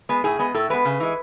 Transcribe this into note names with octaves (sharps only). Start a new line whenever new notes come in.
G#3 B3
A2 G#4
G#3 B3
A2 A4
G#3 B3 B4
C#3
E3 G#3